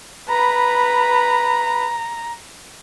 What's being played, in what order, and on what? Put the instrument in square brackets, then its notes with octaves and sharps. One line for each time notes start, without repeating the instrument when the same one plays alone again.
[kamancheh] B4 B5 [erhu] A#5